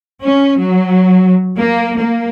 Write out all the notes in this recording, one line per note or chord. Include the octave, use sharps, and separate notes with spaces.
C#4
F#3
A#3
A#3